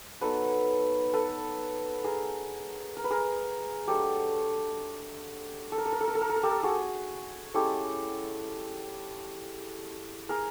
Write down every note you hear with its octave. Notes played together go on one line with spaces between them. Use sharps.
F#3 B3 D#4 A4 B4
A4 B4
G#4 A#4
A#4
B4
G#4 A#4
F#3 A3 D4 G4 A4
A4
A#4
A4
A#4
A4
A#4
A4
A#4
A4
A#4
G4 A4
F#4 G#4
G#3 C#4 E4 G4 A4
G#4 A#4